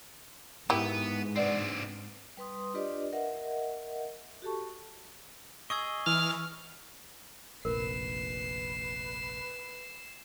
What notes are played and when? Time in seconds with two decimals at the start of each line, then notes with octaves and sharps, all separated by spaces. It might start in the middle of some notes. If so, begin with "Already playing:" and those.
0.70 G#2 B3 E4 G4 A#4
1.36 C4 D4 B4 D5 F#5
2.37 G3 B4 C6 D#6
2.74 D4 F4 G4 B4 D5 D#5
3.13 A#4 D#5 E5 F#5
4.42 F#4 G4 A4 A5 C#6
5.70 G#4 D#5 C#6 E6 G#6
6.06 E3 F6
7.65 F1 A#1 A#4 B4 C7 E7